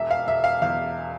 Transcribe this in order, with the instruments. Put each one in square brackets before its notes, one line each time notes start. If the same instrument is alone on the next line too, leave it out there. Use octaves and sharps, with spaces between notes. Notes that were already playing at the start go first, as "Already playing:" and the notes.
Already playing: [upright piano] E1 E5
F5
E1 E5
F5
E2 F5